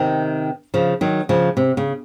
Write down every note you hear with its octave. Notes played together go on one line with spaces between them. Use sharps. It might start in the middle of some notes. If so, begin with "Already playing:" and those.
Already playing: C3 D#3
C#3 F3
D#3 F#3
C#3 F3
C3
C#3